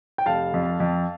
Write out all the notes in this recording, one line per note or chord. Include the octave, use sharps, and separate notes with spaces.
G5
F1 F5 A5
F2
F2